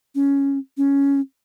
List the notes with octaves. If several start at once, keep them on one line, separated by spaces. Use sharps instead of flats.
C#4
C#4